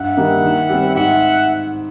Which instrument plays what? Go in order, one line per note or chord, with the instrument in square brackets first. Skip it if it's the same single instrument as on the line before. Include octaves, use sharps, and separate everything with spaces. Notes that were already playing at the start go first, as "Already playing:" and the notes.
Already playing: [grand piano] G2 [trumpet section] E5 F#5
[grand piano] D#3 G3 A#3 D#4
D#3
G3 C4
[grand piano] G#2 [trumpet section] E5 F#5